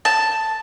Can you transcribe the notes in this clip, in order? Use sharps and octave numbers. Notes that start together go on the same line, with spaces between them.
A5